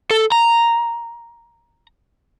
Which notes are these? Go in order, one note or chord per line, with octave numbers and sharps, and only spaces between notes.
A4
A#5